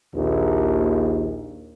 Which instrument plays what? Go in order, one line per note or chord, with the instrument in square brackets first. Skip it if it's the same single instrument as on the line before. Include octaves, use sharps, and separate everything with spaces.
[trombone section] A#1 D#2